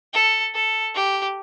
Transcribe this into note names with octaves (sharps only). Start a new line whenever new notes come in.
A4
A4
G4